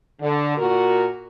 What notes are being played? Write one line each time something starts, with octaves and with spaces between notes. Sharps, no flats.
D3
A#2 F#4 A#4